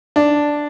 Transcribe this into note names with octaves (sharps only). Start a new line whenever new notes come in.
D4